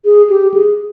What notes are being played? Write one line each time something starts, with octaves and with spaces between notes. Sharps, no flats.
G#4
G4
G#4